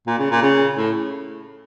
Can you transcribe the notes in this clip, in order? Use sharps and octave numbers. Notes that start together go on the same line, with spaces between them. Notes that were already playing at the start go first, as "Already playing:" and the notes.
A#2
C#3
A#2
C#3
A2